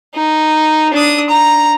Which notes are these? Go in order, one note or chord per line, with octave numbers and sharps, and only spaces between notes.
D#4
D4 D#6
A#5